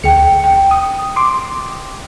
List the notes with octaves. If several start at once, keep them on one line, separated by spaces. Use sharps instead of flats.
D2 G5 C#7 F7
G5
D#6
C6 D6